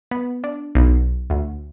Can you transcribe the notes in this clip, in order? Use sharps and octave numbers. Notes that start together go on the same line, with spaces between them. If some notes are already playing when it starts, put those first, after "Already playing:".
B3
D4
B1
D2